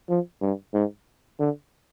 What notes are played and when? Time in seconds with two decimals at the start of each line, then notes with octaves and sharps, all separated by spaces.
0.09 F3
0.42 G2
0.74 G#2
1.39 D3